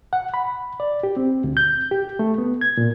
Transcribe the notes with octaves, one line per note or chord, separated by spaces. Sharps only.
F#5
B5
D5
G4
C4
D2
G6
G4
A3
B3
G#6
A#2